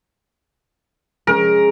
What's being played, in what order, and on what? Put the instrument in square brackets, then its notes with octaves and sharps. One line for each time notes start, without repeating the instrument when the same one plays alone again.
[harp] G#3 C#4 [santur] A#4